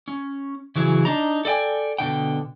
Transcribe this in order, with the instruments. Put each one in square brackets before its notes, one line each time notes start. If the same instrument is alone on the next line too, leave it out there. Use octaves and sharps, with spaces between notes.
[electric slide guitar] C#4
C#3 E3 F#3 G#4
D4 D#4 A#5
A4 D5 D#5 G5 G#5
B2 D3 G5